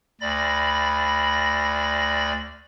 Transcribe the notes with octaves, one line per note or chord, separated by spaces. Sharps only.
D2 D5 B5 A#6